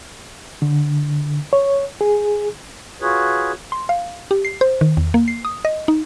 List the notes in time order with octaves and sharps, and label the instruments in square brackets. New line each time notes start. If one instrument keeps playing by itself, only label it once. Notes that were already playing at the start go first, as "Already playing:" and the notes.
[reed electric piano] D3
C#5
G#4
[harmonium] F4 F#4 G#4 B4 C#5
[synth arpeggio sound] C6
F5
G4
C7
C5
D#3
E2
A#3
C7
D#6
D#5
D#4